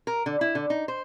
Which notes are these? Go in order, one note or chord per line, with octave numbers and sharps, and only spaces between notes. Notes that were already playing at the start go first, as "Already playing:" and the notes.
A#4
D3
E4
D3
D#4
C5